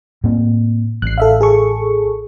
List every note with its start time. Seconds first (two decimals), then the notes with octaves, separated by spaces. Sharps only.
0.24 A2 A#3 C4
1.02 A1 F#6 C7
1.18 A4 E5 F5
1.41 G#4 A4 C#6